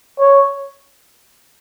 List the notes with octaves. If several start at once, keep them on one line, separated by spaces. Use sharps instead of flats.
C#5